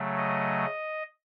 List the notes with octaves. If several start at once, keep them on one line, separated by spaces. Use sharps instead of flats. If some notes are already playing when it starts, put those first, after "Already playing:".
Already playing: C#3 F#3 A3
D#5